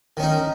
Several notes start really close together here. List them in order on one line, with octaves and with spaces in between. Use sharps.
D#3 C#4 D#4